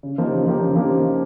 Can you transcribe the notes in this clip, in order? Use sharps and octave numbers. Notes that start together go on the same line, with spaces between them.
C#3
F3 A#3 D#4 G4
C#3
F3 A#3 D#4 G4
C#3
F3 A#3 D#4 G4